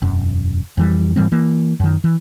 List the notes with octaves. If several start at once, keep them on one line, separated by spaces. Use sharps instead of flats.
E1 F#2
F2 E3 G3
G#2 E3 G3 C4
E3 A#3
F#2 D#3
E3